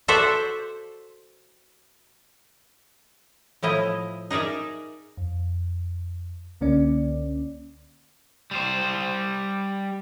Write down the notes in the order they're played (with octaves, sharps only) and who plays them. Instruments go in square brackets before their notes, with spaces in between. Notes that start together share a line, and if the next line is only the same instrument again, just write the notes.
[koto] F#4 A4 C5 D5 E5
A2 F3 E4 D#5
D#4 G#4 A#4 D5 E5
[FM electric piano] F2
C#2 D3 A#3 C#4 D5
[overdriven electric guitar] G3 C5